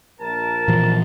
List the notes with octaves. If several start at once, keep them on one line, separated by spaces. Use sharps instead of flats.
A#1 A#4 A5
A#2 E3 F3